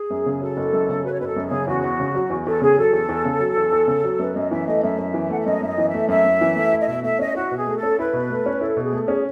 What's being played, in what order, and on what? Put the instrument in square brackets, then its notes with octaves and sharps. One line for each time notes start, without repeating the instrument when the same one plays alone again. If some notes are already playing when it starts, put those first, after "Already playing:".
Already playing: [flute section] G#4
[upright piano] F#2
C#3
[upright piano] F#3 [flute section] A4
[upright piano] F#1
F#2
C#3
[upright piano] F#3 [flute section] B4
[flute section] C#5
[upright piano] F#1 [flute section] B4
[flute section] A4
[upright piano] F#2
[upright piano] C#3 [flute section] G#4
[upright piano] E2 [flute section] F#4
[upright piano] E2
C#3
F#3
E2
[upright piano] E2 [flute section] A4
[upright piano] C#3 [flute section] G#4
[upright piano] F#3 [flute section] A4
[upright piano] E2
E2
C#3
F#3
E2
E2
C#3
F#3
[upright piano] F#2 [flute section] B4
[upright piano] F#2 [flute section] D#5
[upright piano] E3 [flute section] E5
[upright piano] A3 [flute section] D#5
[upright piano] F#2 [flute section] E5
[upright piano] F#2
E3
[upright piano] A3 [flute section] F#5
[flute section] E5
[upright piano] F#2 [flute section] D#5
[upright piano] F#2 [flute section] E5
[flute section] D#5
[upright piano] E3
[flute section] E5
[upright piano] A3
[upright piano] F#2 [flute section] E5
[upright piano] F#2
E3
A3
E4
[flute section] D#5
[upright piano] B2 [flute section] E5
[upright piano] A3 [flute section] E5
[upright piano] C#4 [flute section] D#5
[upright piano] E4 [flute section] F#4
[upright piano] B2 [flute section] G#4
[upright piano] A3
[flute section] A4
[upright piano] C#4
[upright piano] E4 [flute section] B4
[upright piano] B2
A3
C#4
[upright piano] E4 [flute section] A4
[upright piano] B2
[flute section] G#4
[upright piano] A3
[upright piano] C#4 [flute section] G#4